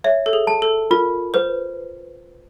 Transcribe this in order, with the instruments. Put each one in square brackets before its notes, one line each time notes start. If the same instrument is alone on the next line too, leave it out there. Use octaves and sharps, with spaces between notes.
[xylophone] C#5 [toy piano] E5
[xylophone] A4
G#4
[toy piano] A5
[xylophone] A4
[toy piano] F4 [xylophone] A#4
[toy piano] B4 [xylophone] C5